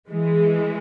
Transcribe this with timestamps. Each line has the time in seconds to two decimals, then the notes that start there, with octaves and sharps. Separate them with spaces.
0.09 E3 G#3